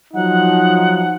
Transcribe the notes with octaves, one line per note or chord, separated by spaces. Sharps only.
F3 F#3 D#4 F#5